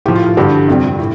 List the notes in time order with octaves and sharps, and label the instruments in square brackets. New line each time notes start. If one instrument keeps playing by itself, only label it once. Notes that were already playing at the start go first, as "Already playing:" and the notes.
[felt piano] A2 G4
F3
F4
F4
G2 D3 G3 G4
F2 C3 G3
A2